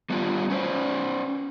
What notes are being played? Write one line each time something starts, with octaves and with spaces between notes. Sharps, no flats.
G3 B3 D4 D#4 F4 G4
C#4 B4 C5 D5